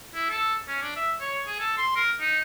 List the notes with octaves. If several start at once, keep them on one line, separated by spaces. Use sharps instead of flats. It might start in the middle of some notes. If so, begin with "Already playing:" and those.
E4
A4
C#4
D4
E5
C#5
G#4
A4
C6
A#4
D#4